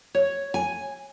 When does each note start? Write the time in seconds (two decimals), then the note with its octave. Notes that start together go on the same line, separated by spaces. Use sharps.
0.15 C#5
0.54 G#5